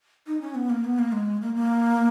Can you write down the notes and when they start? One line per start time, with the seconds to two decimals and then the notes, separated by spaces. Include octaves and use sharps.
0.27 D#4
0.41 C#4
0.55 B3
0.70 A#3
0.84 B3
0.99 A#3
1.12 G#3
1.41 A#3
1.55 A#3